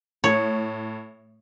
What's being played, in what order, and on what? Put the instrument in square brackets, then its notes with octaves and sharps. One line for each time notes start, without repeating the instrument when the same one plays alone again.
[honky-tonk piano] A2 [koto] C#5